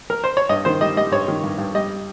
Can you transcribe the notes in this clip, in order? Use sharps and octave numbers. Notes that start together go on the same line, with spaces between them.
A#4
C5
C#5
G2 D#5
D#3 C5
G3 D#5
G3 D#5
G2 C#5
D#3
G2
G2
G3 D#5